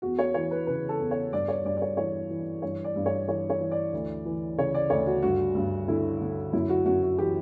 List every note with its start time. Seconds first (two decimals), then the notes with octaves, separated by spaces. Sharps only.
0.02 E2 F#4
0.19 C#5
0.34 E3 C#5
0.51 B4
0.67 C#3 B4
0.89 A4
1.00 E2
1.11 C#5
1.33 G2 D5
1.48 C#5
1.65 G2 D5
1.77 D5
1.82 C#5
1.97 E3 C#5
2.30 E3
2.62 G2 C#5
2.84 D5
2.96 G2
3.06 C#5
3.28 E3 C#5
3.50 C#5
3.60 E3
3.72 D5
3.93 D2
4.25 E3
4.58 C#3 C#5
4.75 D5
4.90 D2 C#5
5.07 F#4
5.22 G2 F#4
5.55 G2
5.88 D3 E4
6.21 D3
6.53 F#2 E4
6.69 F#4
6.85 F#2 F#4
7.03 F#4
7.18 E3 G4